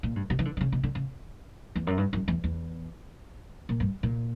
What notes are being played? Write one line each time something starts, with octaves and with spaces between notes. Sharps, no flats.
A#2
G2
B2
E3
D3
D3
C#3
B2
D3
C#3
E2
F#2
G2
F#2
E2
E2
A#2
G2
A#2